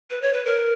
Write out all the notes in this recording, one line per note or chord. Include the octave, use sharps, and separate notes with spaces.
B4
C#5
B4
A#4